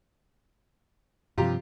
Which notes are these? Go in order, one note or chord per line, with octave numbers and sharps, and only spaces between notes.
G2 C3 F3 F4 G4 A#5